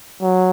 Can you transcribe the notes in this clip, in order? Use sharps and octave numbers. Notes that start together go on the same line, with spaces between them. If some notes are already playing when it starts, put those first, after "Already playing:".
F#3